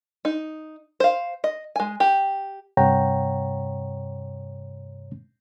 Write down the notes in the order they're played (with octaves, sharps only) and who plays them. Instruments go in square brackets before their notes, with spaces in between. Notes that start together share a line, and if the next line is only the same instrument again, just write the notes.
[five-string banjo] D#4
C5 F5
D#5
G#3 G#5
G4
[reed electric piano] G2 C3 C#5 F#5 G5 A#5